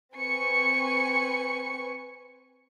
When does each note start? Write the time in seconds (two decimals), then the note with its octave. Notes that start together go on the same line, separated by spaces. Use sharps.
0.14 C4 B4 G#5 C#6 C#7